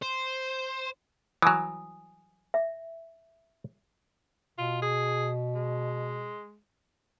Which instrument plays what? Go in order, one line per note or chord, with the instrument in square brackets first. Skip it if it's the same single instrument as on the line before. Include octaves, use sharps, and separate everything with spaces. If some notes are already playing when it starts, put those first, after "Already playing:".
[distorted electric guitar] C5
[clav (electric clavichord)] E3 F#3 [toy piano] G#5 D#6
[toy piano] E5
[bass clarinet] B2 [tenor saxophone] F4
[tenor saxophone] G#4
G#3